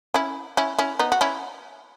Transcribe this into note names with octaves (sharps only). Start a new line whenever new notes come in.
C#4 E4
C#4 E4
C#4 E4
B3 D#4
F#4
C#4 E4